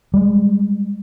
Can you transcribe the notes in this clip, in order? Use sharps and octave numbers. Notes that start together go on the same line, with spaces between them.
G3 G#3